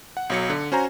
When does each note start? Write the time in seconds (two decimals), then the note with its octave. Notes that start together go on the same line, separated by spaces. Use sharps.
0.17 F#5
0.30 B1 F#3 C#7
0.50 D3
0.72 C#4 F#4 C5 G#5 A#5